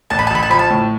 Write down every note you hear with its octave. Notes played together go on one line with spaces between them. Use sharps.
A1 A5
B5
A5
A1 B5
A5
F3 B5
A5
A2